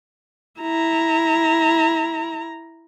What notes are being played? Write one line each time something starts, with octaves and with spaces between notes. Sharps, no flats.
E4 A#5